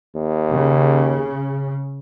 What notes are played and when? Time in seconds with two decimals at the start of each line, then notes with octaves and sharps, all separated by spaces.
0.16 D#2
0.52 C#3